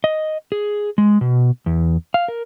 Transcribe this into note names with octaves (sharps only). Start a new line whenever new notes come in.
D#5
G#4
G#3
B2
E2
F5
A#4